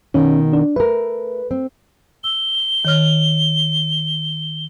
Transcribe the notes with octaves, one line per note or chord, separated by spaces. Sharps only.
B2 D#3 C#4
D4
A3 A#4 B4
C4
E6 G7
D#3 C#5 F6